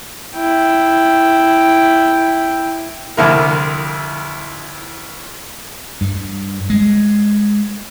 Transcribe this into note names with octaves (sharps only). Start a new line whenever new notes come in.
E4 G5
C2 F2 D3 E4 A#4
G2
G#3